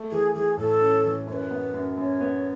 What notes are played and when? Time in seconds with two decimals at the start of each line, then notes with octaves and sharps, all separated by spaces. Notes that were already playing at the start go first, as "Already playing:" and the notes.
Already playing: A3
0.11 E3 G#4
0.34 E3 G#4
0.57 A2 A4
0.81 C#4
1.04 E3
1.27 F#2 C#5
1.33 B4
1.51 B3
1.74 F#2
1.97 F#2 C#5
2.21 B3